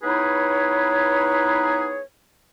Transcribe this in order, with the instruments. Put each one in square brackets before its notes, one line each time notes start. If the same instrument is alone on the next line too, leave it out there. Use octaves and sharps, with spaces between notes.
[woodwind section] B3 D#4 E4 G#4 B4 C#5